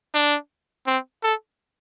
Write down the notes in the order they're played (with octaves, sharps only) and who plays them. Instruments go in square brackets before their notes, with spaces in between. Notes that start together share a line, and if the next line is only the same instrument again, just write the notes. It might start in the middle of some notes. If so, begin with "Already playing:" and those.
[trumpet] D4
C4
A4